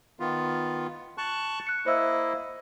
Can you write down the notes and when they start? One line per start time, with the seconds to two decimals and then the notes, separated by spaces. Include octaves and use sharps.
0.20 D#3 B3 F4
1.18 A5 C#6 F#6
1.67 F#6 C#7
1.86 A#3 E4 C5 D#5 E5 E6